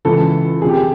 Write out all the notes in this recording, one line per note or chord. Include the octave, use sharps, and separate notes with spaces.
C#2 C#3 E3 A4
D2 C3 F3 G#4
G4
G#4